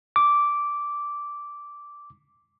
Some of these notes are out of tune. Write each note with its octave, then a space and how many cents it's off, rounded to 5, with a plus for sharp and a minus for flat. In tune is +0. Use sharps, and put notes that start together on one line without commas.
D6 -10